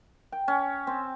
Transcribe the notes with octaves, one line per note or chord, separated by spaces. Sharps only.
G5
C#4
C4